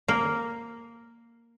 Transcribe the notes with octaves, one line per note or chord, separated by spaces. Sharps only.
A#3